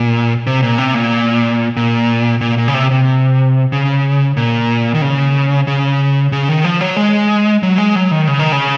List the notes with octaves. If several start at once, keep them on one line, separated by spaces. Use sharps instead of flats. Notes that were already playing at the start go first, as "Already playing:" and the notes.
Already playing: A#2
C3
A#2
C3
A#2
A#2
A#2
A#2
C#3
C3
C3
C#3
A#2
D#3
C#3
C#3
C#3
D#3
F3
F#3
G#3
F#3
G#3
F#3
D#3
C#3
D#3
C#3